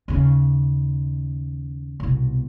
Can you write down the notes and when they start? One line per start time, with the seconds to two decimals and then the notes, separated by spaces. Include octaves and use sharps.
0.08 D#2 C#3
2.00 C2 B2